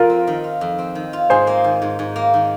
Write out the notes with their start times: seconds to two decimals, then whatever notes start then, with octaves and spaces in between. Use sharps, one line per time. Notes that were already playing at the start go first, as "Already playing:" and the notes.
Already playing: F2 F4 A#4
0.10 C4
0.27 D#3
0.44 F4
0.61 F2
0.79 C4
0.95 D#3
1.13 F4
1.30 G#2 G#4 C5
1.47 A#3
1.64 D#3
1.82 G#2
1.99 G#2
2.16 A#3
2.34 D#3